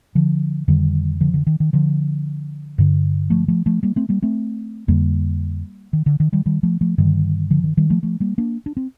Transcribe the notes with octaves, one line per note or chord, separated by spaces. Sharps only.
D3 F3
F2 D3 D#3 G3
D3 F3
D3
D#3
D#3
D3 F3
G2 D3
F3 A3
F3 A3
F3 A3
G3 A#3
A3 C4
G3 A#3
A3 C4
F2 D3 G3 A#3
D#3
D3
D#3
D#3 G3
D#3 G3
F3 A3
F3 A3
G2 D3 D#3 G3
D3 F3
D#3
D#3 G3
F3 A3
F3 A3
G3 A#3
A#3 D4
D4
C4